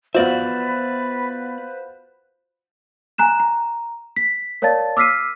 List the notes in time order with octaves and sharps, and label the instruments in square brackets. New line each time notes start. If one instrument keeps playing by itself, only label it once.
[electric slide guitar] B3 D5 E5 [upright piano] F4 F#4 [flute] B4 [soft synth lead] C5
[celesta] G#5 A#5 F#6 E7
A#5
B6
A#4 C#5 D5 F5 A5 A6
D6 E6 F6 B6 C7 D#7